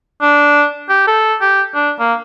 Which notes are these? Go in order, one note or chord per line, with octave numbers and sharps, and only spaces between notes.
D4
G4
A4
G4
D4
A#3